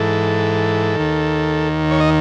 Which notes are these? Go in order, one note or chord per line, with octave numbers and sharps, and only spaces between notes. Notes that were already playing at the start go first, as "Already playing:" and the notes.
Already playing: G#2 E3 A4
D#2 D#3
C#5
D#5